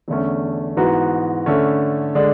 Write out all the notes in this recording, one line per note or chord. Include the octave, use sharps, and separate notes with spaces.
E2 D3 A3 C#4
G#2 E3 B3 F#4
D3 A3 C#4
D3 G#3 D4